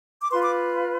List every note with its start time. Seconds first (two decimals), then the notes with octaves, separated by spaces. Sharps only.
0.23 D6
0.30 F4 B4 C6
0.42 D6